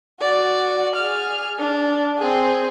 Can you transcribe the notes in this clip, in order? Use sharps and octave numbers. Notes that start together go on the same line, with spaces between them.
F#4 D5
G#4 F6
D4
C4 G#4